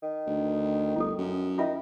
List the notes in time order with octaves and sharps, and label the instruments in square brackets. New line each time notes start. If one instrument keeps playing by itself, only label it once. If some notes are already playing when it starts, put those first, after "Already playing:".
[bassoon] D#3
[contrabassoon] D2
[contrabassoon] G1 [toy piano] E4 A4
[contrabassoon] F#2
[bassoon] D#3 [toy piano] E4 F4 E5